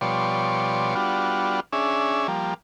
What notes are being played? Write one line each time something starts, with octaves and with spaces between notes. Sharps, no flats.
B2 F3 G3 C#5 D5 C6
G3 B3 D4 F4 F#4
C#4 D4 G#4 E5
F3 G3 A#3